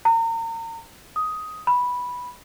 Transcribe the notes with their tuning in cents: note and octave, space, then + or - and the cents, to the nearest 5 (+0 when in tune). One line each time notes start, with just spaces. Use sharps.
A#5 -35
D#6 +10
B5 -5